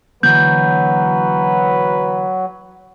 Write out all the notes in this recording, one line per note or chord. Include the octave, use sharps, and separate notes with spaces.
D3 E3 F#3 A#3 B4 G6